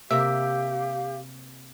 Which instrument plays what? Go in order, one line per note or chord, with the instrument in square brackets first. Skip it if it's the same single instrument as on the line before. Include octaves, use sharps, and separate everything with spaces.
[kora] C3 A#3 [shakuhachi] G4 [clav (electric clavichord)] E5 [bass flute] F5